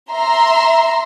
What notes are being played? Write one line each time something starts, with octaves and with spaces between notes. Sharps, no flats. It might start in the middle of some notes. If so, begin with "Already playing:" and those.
E5 A#5 C6